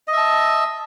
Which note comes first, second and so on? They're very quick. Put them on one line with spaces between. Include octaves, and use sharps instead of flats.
D#5 E5 A5